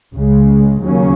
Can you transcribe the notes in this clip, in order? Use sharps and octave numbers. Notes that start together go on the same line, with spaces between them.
C#2 C#3 G#3
D#2 C#3 F#3 A#3 C#4